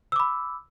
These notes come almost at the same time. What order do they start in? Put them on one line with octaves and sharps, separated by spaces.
E6 D6 B5